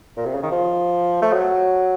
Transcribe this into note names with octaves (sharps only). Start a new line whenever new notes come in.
A#2
C3
C#3
D#3
F3
A3
F#3